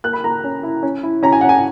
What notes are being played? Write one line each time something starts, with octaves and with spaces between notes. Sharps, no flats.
A#3 F#6
B5
A#3 A#5
C#4
E4
C#4
E4
C#4 A#5
G#5
C#4 F#5
G#5